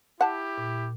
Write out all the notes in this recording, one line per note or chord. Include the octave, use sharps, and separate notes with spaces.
E4 G4 F#5 A5
A#2